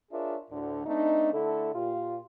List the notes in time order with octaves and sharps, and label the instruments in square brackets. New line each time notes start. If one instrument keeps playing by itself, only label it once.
[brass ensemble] D4 F4 G#4 A#4 C#5 E5
D2 A2 D3
A3 C4 D4 D#4
D3 A3 E4 A4
A#2 F4 G4